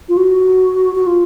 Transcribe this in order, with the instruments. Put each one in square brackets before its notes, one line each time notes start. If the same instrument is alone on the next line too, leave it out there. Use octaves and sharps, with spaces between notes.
[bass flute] F4
F#4
F#4
F4